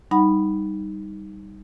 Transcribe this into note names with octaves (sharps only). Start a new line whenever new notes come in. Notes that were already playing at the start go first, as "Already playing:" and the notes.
G3 D#4 F#5 B5